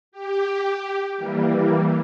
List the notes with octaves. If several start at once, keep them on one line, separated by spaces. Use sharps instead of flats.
G4
E3 G3 A#3